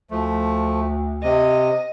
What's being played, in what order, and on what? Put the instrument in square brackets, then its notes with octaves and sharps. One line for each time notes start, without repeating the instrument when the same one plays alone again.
[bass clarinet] D2 [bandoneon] F3 A3
[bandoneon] C3 [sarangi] D#5